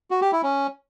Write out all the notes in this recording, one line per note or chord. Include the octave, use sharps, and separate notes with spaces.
F#4
G4
E4
C#4